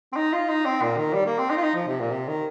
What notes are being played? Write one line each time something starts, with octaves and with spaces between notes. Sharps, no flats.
C4
D#4
F4
D#4
C4
A#2
D#3
G3
A#3
C4
D#4
F4
D#4
F3
C3
A#2
C3
D#3